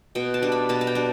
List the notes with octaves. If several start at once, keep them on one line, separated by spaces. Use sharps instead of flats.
B2 G5
A5
G3 D4
B5
B2 A5
A5
G5
G3 D4